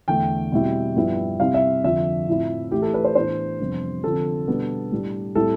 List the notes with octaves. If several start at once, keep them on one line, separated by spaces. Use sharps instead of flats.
E2 D3 A3 G5
B2 G3 C4 E4
G2 F3 B3 E4
C3 G3 C4 E4 F5
E5
F2 D3 F3 E5
A2 F3 C4 E4
A2 E3 A3 E4 G4
A4
B4
C5
A2 E3 B3 D4 C5
F2 C3 G3 B3 D4
D3 F3 C4 A4
B2 G3 B3 D4
A2 G3 D4
A2 G3 C4 E4 A4